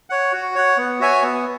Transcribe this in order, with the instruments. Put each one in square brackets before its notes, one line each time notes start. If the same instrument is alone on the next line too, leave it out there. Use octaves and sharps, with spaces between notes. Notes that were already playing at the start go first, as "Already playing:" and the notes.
[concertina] C#5 F#5
F#4
C#5 F#5
B3
F#4 C#5 E5 G#5
B3